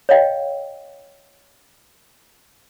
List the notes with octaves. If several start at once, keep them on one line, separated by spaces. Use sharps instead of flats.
C#5 D#5 F5 G5